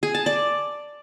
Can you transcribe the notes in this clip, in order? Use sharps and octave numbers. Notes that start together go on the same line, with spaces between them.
G#4
A5
D5